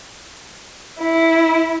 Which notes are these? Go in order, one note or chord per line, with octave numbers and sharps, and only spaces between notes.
E4